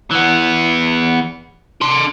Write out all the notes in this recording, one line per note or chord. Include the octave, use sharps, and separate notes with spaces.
E3 B3
D4 C6